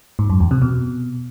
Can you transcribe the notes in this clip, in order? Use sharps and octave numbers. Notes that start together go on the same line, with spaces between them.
G#2
F#2
E2
C3
B2